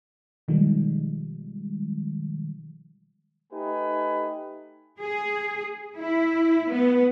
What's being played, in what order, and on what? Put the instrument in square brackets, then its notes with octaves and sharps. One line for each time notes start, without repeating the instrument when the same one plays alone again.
[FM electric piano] B2 D#3 F3 G3 G#3
[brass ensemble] A3 D#4 G4 B4 G#5
[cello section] G#4
E4
B3